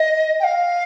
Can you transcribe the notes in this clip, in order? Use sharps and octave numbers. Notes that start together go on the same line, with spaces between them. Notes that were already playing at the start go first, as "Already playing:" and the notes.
Already playing: D#5
G5
F5